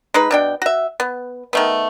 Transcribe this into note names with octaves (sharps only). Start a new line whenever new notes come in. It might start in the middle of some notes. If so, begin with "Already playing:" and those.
G#3 D#4 B4
B2 D4 G5
F#4 E5
B3
D#3 A3 B3